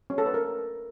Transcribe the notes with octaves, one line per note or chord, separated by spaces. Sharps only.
C#4
A4
B4
A#4